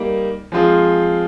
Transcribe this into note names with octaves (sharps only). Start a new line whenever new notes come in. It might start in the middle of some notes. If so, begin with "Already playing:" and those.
Already playing: G3 A#3 D#4
F3 G#3 C4 F4 G#4